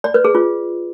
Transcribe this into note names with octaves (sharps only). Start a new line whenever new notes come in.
D5
B4
G#4
F4